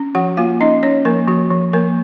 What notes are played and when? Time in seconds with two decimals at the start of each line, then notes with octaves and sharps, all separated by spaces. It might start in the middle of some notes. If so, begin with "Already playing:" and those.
Already playing: C#4
0.15 F3 F#4 F#5
0.37 A#3 F4 F5
0.60 C#4 D#4 D#5
0.83 C#4 C#5
1.05 F3 A#3 A#4
1.28 F3 F#4
1.51 F3
1.73 F3 A#3 A#4